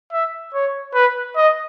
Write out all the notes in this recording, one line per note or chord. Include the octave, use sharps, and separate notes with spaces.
E5
C#5
B4
D#5